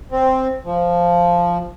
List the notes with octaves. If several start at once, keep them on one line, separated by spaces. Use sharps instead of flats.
C4
F3